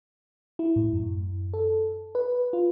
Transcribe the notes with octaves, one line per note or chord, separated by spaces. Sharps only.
E4
A2
F#2
A4
B4
F4